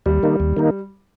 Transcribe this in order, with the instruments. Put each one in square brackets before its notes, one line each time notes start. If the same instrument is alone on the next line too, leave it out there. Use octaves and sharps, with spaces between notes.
[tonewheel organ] D#2 [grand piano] G3
[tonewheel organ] D#3 A#3 D#4
D#2
D#3 A#3 D#4